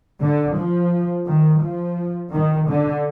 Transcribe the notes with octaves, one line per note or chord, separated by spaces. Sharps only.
D3
F3
D#3
F3
D#3
D3